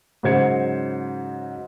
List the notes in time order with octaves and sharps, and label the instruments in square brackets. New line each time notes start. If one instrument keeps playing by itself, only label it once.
[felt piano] G#2 C#3 F#3 C5 G#6 C#7